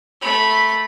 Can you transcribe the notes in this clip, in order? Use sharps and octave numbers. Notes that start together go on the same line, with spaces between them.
A3 B5